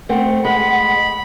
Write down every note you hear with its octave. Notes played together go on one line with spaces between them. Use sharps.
A3 C4 F#5
G#3 B5